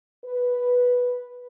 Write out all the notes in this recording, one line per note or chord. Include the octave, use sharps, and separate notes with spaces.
B4